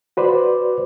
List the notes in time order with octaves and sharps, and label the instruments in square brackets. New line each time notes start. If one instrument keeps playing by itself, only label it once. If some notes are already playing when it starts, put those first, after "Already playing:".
[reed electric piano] F#4 B4 C5 D5